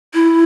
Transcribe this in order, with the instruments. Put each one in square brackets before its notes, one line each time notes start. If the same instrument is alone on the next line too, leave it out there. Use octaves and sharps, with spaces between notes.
[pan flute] E4